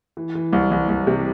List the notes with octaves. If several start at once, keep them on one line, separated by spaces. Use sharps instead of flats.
E3
E3
C2
C2
C2
C3